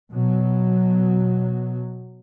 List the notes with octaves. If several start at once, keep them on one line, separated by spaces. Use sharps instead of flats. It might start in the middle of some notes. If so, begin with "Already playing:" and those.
B2 F#3